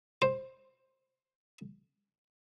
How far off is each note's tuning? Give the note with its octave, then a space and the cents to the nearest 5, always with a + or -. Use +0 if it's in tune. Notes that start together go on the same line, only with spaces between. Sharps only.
C5 +10